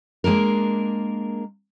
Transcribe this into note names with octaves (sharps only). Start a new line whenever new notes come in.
G#3 A#3 D4 A#4